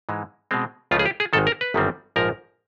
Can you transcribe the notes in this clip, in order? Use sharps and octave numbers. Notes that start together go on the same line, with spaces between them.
G#2 E3 G#3
B2 G#3 C4
C#2 C#3 F3 A3 F4
G#4
G4
G#4
G#1 G#2 D#3 A4
A#4
B4
G1 F#2 D#3 G3 C4
A#1 G#2 F3 A#4